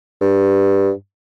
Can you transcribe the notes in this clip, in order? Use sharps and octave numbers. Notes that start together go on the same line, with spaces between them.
G2